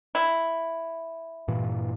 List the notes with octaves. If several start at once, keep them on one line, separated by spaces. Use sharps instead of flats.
E4
G2 A#2 E3